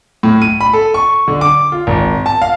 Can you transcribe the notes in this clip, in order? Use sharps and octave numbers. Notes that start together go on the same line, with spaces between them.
A2
D#7
B5
A4
C#6
D3
D6
F4
G#1
A5
F5